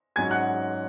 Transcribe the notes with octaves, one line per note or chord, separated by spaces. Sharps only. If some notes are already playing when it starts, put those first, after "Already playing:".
G#2 F#3 C#4 G#5 G#6
F#5 F#6